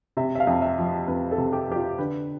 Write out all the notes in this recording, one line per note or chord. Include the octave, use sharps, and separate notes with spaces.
C3 E5
E5
F5
F2
E5
F3
F2 B4
A4
C3
G4
F2 G4
F4
D3 B4